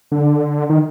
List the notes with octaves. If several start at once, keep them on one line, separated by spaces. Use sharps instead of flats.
D3
D#3